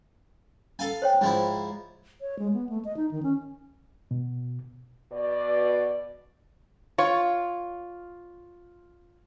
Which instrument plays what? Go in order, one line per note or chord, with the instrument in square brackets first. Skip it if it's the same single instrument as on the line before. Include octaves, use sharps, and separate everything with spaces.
[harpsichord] A4 F5 G#5
[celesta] C5 C#5 G5
[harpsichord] G#2 F3 E4
[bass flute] C#5
G#3
B3
A3
D#5
D#4
D#3
C#4
[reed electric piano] B2
[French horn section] B2 D5
[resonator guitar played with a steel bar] F4 [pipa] C#5